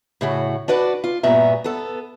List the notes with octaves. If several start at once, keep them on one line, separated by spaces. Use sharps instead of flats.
A2 C#3 F#4
D4 F#4 B4 D5
F4
G2 A#2 B3 F#4 E5 A#5
B3 A4